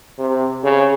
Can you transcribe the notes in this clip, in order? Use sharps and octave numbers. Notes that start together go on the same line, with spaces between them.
C3
C#3